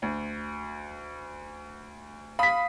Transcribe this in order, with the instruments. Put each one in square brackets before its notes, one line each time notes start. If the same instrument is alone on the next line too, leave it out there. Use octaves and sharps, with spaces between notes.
[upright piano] D2
[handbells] F5 D#6 [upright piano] B5 B6